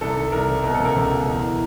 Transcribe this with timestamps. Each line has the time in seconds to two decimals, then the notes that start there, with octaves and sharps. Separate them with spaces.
0.01 C2 A4
0.17 D#3
0.32 C2 A#4
0.48 C3
0.64 B2 A#4
0.74 A4
0.80 C#2
0.85 A#4
0.96 C#2
1.12 B2
1.27 E2
1.44 E3